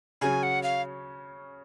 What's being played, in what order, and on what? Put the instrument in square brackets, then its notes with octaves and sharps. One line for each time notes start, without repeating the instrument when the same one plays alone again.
[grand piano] C#3 F#3 C#4 [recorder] G#5
[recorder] F#5
F5